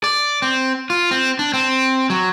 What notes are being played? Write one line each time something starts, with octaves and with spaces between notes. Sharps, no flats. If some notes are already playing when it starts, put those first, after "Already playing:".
D5
C4
F4
C4
D4
C4
F#3